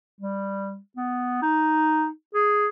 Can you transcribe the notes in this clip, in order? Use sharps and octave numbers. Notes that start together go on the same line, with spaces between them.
G3
B3
D#4
G#4